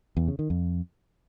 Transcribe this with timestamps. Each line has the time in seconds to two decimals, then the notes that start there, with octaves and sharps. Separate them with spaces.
0.17 E2
0.28 C#3
0.39 D#3
0.50 F2